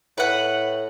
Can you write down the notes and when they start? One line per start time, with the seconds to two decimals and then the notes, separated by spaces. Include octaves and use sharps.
0.18 A2 B4 F#5